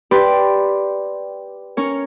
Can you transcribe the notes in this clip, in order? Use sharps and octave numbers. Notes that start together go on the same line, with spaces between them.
G4 B4 D5 C6
C#4 A#4 C#5